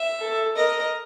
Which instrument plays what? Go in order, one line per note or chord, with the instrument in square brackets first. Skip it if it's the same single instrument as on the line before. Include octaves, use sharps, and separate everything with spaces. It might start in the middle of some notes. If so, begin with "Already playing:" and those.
Already playing: [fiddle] E5
[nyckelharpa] A4
[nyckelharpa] A#4 [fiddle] D#5